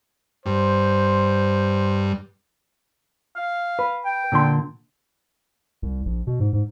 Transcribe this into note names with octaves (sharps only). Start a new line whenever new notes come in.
G2 C5
F5
B4
G5
A#2 D3 C6
C2
A#1
B2
G#2
G#2